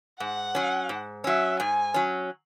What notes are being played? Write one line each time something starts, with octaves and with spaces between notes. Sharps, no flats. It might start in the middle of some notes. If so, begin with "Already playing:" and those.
G#2 F#5
F#3 C#4
G#2
F#3 C#4 E5
G#2 G#5
F#3 C#4